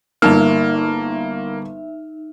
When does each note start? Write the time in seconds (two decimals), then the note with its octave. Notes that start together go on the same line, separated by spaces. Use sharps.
0.22 G1 A#3 D#4 E5 A5 F6